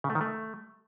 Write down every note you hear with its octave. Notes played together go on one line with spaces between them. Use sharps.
C#3
A3
D#3
A3